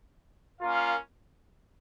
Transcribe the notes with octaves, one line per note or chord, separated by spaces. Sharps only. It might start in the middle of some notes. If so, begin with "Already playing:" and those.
A#3 C#4 F4 A#4 F5